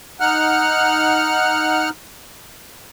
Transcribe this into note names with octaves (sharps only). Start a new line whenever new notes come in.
D#4 F#5 F6 F#6